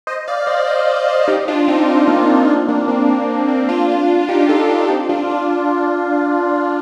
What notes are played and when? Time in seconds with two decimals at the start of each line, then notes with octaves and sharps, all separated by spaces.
0.07 C5 D#5
0.28 D5 F5
0.47 C5 D#5
0.60 D5
0.67 C5 D#5
0.87 D5 F5
1.08 C5 D#5
1.28 D#4 G4
1.48 D4 F4
1.68 C4 D#4
1.88 C4
2.08 A#3 D4
2.28 D4 F4
2.48 D4 F4
2.68 A#3 D4
2.88 C4
3.09 A#3
3.29 C4
3.49 C4
3.69 D4 F4
4.28 D#4 G4
4.49 F4 A4
4.69 D4 F4
4.89 C4 D#4
5.09 D4 F4
5.29 D4 F4